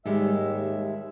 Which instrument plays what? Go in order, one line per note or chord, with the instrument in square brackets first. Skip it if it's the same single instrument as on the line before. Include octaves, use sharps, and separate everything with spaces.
[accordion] D#2 E5 E6 [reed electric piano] G#2 [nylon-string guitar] D#3 G3 G#3